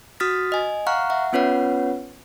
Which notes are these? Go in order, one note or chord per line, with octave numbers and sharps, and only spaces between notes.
F#4 D#6 F6 A6 B6
D#5 G#5
F5 F#5 A#5 C#6 F6 F#6
E5 F#5
B3 C#4 F4 B4 C#5 F#5